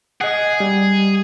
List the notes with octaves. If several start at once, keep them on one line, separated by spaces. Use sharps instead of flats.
G#4 D#5 F#5
G3